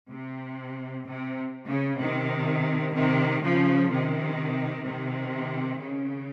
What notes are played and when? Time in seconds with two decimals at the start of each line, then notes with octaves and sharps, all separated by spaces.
0.11 C3
1.06 C3
1.70 C#3
2.00 C3 D#3
2.95 C3 D#3
3.44 C#3 F3
3.91 C3 D#3
4.86 C3 D#3
5.81 C#3